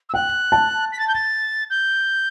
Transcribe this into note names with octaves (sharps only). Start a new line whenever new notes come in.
E6
G5 F#6
A5
B6
A6
G6
A6
G6